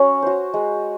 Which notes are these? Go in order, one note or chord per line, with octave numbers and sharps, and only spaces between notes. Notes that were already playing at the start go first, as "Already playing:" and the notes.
Already playing: C#4 F#4 C#5
F#4 C5
G#3